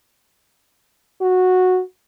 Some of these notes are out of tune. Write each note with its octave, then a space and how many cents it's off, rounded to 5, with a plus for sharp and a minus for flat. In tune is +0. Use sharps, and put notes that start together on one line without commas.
F#4 -10